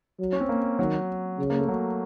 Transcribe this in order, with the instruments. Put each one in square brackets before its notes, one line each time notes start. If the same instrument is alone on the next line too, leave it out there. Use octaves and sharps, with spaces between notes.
[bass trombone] F#3
[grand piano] C#4
C4
A#3
[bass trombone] D#3 [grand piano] F#3
[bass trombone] C#3
[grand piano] A#3
A3
F#3